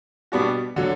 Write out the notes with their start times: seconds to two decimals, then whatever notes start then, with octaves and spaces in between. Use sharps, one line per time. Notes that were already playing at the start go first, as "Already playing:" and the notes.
0.32 B2 G3 B3 D4 F#4
0.76 D3 F#3